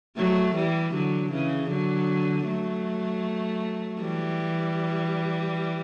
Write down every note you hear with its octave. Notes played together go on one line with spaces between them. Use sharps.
F#3 A3
E3 G3
D3 F#3
C#3 E3
D3 F#3
F#3 A3
E3 G3